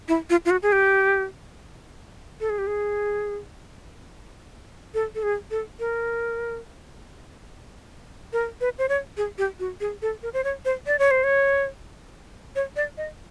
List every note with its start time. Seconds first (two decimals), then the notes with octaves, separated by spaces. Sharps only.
0.08 E4
0.30 F4
0.45 F4
0.50 F#4
0.63 G#4
0.72 G4
2.40 A4
2.50 G#4
2.58 G4
2.67 G#4
4.94 A4
5.15 A4
5.23 G#4
5.51 A4
5.80 A#4
8.33 A#4
8.61 B4
8.78 C5
8.89 C#5
9.17 G#4
9.38 G4
9.59 F#4
9.81 G#4
10.02 A4
10.23 A#4
10.33 C5
10.44 C#5
10.65 C5
10.87 D5
10.99 C#5
11.11 C5
11.24 C#5
12.56 C#5
12.76 D5
12.97 D#5